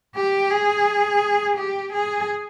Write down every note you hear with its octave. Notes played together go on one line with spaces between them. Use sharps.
G4
G#4
G4
G#4